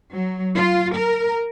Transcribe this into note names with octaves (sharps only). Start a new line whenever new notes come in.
F#3
F4
A#4